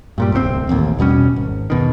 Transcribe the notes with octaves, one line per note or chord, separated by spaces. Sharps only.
G2 A#2 G3
D1 C2 D3 C4
D#1 A1 D#2
E2 B2 G3 C#4
G#1
E2 B2 D#3